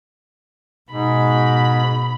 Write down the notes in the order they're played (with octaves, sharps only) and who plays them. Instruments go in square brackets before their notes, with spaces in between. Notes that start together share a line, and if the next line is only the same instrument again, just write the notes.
[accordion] G#2 [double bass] B2 [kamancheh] B5